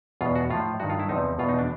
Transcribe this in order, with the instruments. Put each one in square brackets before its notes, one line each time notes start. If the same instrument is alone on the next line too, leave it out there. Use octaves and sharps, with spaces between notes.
[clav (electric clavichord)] E2 B2 F4
F#4
A2 F3 F4
G2 D#3 F#4
F4
E4
E2 C3 F3 D#4
E2 B2 F4
D#4
D4